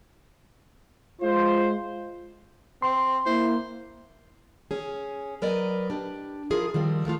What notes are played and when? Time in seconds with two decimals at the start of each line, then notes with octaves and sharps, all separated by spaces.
1.22 G#3 F4 C5
2.82 C4 C6
3.26 A#3 E4 C5
4.71 C#4 G#4
5.42 F#3 A#4 B4 D5 D#5
5.90 D4 G4
6.50 F3 E4 F4 G#4 A#4
6.74 D#3 F3 G3 C4
7.05 D#3 F3 A3 F4